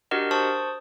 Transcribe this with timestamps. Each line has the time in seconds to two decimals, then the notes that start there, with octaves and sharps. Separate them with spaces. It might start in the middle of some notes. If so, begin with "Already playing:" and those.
0.11 D4 F#4 G4 A#4 D#5 F#5
0.31 C5 A5 C#6 D#6